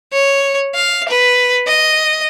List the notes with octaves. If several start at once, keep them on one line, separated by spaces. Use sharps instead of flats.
C#5
F5
B4
D#5